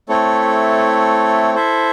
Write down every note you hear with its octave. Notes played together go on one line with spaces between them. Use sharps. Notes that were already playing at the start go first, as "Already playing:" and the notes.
A3 C4 E4 A4 C#5
E4 A4 C5 E5